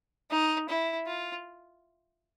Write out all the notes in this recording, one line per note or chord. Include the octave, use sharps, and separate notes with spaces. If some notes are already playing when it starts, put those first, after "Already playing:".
D#4
E4
F4